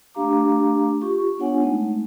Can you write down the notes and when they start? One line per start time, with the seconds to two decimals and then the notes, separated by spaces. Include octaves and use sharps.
0.14 A3 D4 G4 F5 A#5 D6
1.01 F4 G4 C#6
1.38 B3 D4 F4 C#5 F#5 G#5
1.60 G#3 A3 C4 D#4